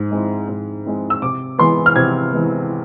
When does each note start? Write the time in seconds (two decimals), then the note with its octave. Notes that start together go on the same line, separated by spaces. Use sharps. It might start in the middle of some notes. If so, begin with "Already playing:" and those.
Already playing: G#2
0.11 G#3 C4 E4
0.49 G#2
0.85 G#3 C4 E4
1.10 E6
1.22 C3 D6
1.59 E3 G#3 B3 C6
1.86 F6
1.96 C3 G#6
2.33 E3 G#3 B3